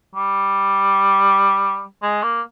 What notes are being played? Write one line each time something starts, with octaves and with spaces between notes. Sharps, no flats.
G3
G#3
A#3